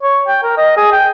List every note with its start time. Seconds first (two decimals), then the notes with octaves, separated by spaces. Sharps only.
0.03 C#5
0.28 G5
0.44 A#4
0.58 D#5
0.77 G#4
0.92 G5